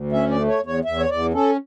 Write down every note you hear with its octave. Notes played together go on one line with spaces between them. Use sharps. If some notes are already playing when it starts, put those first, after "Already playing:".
Already playing: D2
C#4 E5
D5
A3
C#5
E2
C#5
E2 E5
C#5
E2 D5
C#4 A4